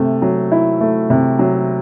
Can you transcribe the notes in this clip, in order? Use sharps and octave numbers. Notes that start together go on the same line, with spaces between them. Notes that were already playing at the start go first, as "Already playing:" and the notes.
Already playing: C3 A3
F#3
E4
A3
C3
F#3